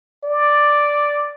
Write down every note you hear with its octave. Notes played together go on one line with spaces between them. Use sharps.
D5